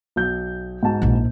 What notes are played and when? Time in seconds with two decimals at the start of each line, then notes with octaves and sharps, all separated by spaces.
0.16 B1 G6
0.83 G#2 F#4 A5
1.02 A#1 E4